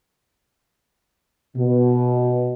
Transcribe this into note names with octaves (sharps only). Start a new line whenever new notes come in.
B2